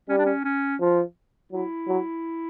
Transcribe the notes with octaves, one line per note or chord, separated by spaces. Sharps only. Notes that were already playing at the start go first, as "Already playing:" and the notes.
G3 C#4
D4
C#4
C#4
F3
F#3 E4
F#3